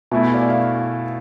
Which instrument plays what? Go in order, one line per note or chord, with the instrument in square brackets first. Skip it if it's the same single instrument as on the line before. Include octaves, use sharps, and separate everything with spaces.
[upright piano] B2 A3 E4 [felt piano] E5 G#5
[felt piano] G#5
D5 F5
F5